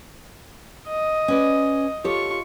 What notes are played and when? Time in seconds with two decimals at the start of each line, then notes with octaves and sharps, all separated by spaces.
0.88 D#5
1.28 C#4 B4 D5
2.04 F4 G4 A4 C#5 C#6